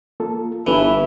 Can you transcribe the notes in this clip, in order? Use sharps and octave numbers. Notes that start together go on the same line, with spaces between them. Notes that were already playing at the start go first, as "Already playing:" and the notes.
A#3 F4 A4
G1 E3 E4 A4 B4 E5